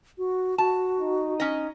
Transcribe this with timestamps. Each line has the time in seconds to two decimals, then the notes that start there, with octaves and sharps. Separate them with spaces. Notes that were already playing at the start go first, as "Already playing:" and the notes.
0.18 F#4
0.58 F#4 A5
1.01 D#4
1.40 C#4 D#5